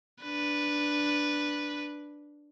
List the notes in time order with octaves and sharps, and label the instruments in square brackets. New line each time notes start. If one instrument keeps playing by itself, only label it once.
[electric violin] D4 B4